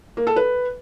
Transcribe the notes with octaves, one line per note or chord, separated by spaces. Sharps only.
A#3
A4
B4